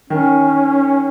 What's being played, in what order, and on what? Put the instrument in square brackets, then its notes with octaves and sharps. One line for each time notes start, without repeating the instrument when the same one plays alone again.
[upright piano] D#3 [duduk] C#4